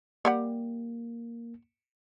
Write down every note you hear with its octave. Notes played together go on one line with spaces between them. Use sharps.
G3 A#3 G4 F#5